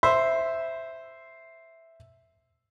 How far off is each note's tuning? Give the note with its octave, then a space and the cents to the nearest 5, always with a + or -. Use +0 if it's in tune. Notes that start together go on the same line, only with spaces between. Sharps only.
C5 +0 E5 +0